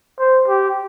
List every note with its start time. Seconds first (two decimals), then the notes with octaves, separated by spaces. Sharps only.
0.19 C5
0.48 G4